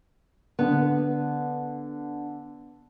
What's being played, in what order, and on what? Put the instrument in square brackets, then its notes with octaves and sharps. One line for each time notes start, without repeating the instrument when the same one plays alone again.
[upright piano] D3 [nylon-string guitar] B3